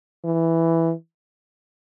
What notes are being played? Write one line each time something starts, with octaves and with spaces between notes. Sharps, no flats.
E3